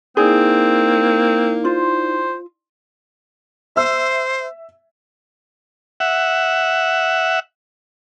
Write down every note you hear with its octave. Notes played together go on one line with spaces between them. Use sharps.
A#3 C4 D#4 E4 G#4 D5
F4 C5
C5 E5 E6
E5 F#5